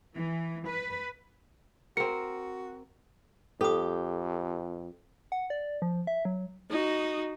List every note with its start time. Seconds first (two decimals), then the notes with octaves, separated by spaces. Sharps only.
0.15 E3
0.68 B4
1.97 C4 F#4 A#4 C#7
3.61 F2 G4 A4 D#6
5.32 F#5
5.50 D5
5.82 F3
6.07 E5
6.25 F#3
6.70 D#4 F#4